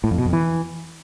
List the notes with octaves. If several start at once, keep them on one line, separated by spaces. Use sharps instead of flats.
A2
F2
B2
F2
E3